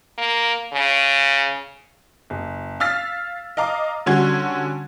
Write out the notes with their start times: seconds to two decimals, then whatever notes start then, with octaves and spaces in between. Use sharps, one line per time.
0.18 A#3
0.73 C#3
2.30 F#1
2.80 F5 E6 F6 A6 B6
3.57 D#5 F5 A#5 D6
4.06 D3 G3 C#4 F#4 C6 G#6